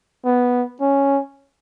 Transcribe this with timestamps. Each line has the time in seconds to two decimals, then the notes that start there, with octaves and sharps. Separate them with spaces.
0.25 B3
0.81 C#4